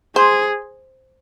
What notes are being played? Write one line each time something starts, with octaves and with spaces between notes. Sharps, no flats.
G#4 C5